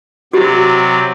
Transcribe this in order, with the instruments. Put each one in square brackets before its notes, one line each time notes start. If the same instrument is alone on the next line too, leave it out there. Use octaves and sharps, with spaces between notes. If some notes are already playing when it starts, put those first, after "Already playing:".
[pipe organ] C3 F#3 D5 [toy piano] F#4 G4